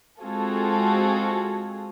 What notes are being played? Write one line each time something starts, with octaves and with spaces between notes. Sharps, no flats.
G#3 C4 F4 F#4 G#4 A4